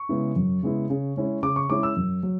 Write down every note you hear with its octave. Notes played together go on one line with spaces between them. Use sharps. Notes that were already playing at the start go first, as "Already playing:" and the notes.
Already playing: C#6
C#3 G#3 B3 E4
F#2
C#3 G#3 B3 E4
C#3
G#3 C#4 E4
C#3 D6
C#6
G#3 C#4 E4 D6
E6
F#2
F#3